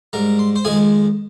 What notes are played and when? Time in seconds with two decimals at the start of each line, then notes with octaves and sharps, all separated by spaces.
0.13 G#2 G3 A#4 A#5
0.39 C6
0.56 C5 C6
0.65 F2 D#3 G#3 G#4 G#5